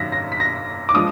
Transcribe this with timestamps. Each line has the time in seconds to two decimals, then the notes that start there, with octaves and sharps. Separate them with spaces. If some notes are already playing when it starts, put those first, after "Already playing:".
Already playing: F#2 D#3 A#6 B6
0.12 A#6
0.32 B6
0.40 A#6
0.89 D6
0.94 F3 G#3 D4 D#6